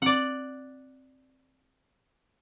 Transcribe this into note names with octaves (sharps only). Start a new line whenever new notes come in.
C4 D5 F#5